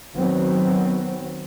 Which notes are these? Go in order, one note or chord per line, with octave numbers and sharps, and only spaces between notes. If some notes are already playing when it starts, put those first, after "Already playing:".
D#3 F#3 B3 C4